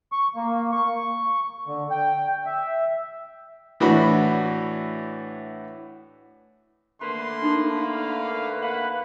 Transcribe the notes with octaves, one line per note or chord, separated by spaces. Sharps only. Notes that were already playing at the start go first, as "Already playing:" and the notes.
C#6
A#3
C#6
D3
G5
E5
A2 E3 D4 F#4 B5
D3 A3 A#3 B4 B5 C6
D4 D#4 A4
F5
B4 F5 F#5 B5